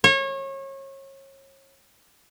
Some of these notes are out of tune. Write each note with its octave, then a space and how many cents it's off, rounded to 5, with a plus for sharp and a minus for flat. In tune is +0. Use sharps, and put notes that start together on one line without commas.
C#5 -30